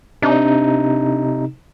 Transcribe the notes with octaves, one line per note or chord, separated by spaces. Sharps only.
C3 D4 D#4